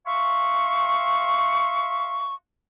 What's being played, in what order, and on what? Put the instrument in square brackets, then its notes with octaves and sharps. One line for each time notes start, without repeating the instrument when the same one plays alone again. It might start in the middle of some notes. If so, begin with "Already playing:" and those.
[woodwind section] E5 F5 C6 C#6